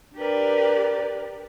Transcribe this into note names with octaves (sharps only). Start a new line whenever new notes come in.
D4 G4 A#4 B4 D5